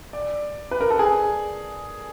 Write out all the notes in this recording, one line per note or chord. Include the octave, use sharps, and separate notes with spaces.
D5
B4
A#4
A4
G#4